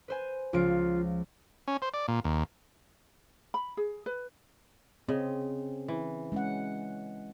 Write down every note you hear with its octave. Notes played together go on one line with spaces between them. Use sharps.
B4 C5 G#5
C#2 F3 F4 D7
C#4
C5
D5
A#2
D#2
B5
G#4
B4
C#3 C4 D#5
E3
G#3 C#4 F#5